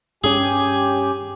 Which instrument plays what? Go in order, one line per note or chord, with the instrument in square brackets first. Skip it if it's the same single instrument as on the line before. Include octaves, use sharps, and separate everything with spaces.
[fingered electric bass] G2 C#4 [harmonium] G4 G#5 [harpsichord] G#4